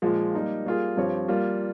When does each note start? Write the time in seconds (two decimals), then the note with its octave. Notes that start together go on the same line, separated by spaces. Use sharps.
0.02 A#2 F3 G#3
0.34 G3 A#3 D#4 A#4
0.66 G3 A#3 F4 G#4
0.97 G2 F3 C4 G4 C#5
1.28 G3 A#3 F4